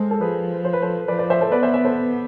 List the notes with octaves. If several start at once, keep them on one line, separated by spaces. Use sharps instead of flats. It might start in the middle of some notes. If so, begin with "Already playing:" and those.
Already playing: G#3 A4 C5
A4
F3 G#4 B4
C5
B4
A4 C5
F3 B4 D5
B4 D5
C5 E5
A4 C5
B3 B4 D5
C5 E5
C5 E5
A4 C5